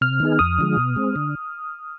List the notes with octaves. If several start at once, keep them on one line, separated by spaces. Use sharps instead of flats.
C3 F6
D#3 B3 D#4 G#4
F2 D#6
D3 F3 G#3
B2
G#3 C4
D3